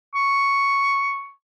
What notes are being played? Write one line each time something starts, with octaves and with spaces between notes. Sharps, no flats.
C#6